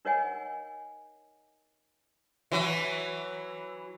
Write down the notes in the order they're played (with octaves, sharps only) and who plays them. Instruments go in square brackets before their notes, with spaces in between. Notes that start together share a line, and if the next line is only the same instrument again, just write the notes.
[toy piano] D#4 A#4 C#5 D#5 F#5 G#5
[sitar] E3 F#3 F#4